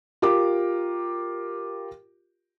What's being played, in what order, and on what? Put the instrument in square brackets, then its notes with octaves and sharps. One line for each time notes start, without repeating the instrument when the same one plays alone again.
[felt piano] F4 G4 A#4 D6